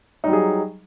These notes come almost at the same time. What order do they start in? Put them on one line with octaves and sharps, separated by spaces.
D#4 G3 F#3 G#4